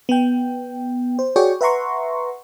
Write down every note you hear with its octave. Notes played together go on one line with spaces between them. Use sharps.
B3 G5
C5
F#4 G#4 C#5 D5 G5 C#6
B4 E5 F#5 A#5 C6 C#6